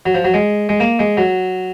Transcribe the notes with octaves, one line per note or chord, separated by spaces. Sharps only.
F#3
F3
F#3
G#3
G#3
A#3
G#3
F#3